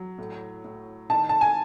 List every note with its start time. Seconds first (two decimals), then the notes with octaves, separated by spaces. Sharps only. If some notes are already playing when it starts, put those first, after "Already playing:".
Already playing: F#3
0.18 A2
0.64 A2
1.10 D#3 A5
1.29 A5
1.41 G#5